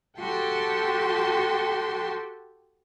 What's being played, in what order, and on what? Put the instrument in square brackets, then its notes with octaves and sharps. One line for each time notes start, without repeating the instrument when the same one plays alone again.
[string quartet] F#4 G4 A4 G5 A5 C6